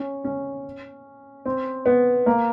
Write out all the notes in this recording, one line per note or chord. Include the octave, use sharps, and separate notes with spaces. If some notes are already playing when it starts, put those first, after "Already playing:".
Already playing: C#4
C#4
C4
B3
A#3